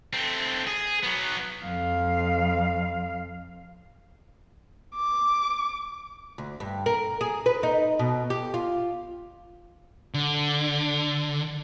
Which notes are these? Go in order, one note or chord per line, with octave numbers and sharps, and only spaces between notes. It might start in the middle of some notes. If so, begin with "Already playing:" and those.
A3 C4
G#4
F#3 B3
F2 F5
D6
D2
G2
A#4
G#4
B4
D#4
B2
G4
F4
D3